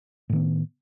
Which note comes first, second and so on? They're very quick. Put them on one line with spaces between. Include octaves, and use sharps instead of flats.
A2 D#3 B3